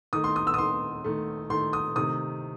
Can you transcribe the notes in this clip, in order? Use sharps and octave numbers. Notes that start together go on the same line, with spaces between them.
D#3 A3 D#6
C6
D#6
E6
D#6
D#3 A3 C6
D#3 A3
D#3 A3 C6
D#6
C3 D#3 A3 D#6